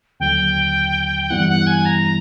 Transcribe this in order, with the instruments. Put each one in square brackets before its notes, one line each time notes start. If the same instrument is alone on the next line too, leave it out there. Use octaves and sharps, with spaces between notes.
[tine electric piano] D#2 D3 F#3 [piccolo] G5
[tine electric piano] G2 E3 G3 B3 E4 [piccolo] F#5
[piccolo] F#5
G#5
A#5